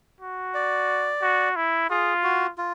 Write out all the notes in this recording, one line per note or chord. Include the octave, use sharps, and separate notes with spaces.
F#4
D5
F#4
E4
F4 G#4
F#4
F4